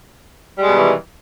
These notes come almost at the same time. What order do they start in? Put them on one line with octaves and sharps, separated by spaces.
G3 G#3 B2 D#3 E3